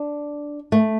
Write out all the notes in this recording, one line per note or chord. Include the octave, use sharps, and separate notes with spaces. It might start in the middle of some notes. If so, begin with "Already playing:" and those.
Already playing: D4
A3